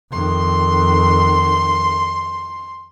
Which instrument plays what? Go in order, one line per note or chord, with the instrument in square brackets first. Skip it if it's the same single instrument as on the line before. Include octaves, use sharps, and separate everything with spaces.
[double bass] F2 D#3 [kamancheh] C6